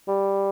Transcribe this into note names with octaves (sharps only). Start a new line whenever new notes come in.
G3